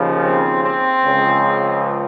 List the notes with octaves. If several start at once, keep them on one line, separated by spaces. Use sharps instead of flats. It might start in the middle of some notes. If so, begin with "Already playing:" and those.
Already playing: D#2 C#3 F3
C4
C4
C#2 C#3 F3